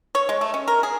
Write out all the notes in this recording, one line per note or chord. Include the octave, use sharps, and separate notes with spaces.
C#5
G#3
A3
C#4
A#4
G#4